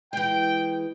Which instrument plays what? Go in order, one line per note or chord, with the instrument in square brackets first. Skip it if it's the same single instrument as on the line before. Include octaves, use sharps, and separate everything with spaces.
[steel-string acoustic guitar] E3 G#3 [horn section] G5